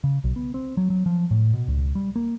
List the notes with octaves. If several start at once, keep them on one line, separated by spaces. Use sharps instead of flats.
C#3
B1
B3
C4
F#3
F#3
F3
A2
B2
C#2
G3
A#3